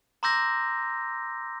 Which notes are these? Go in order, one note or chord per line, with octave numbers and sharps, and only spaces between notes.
A#5 C6 D6 E6 G6 A#6